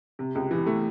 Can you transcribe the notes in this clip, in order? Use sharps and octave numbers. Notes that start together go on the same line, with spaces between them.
C3
C#2
E3
A3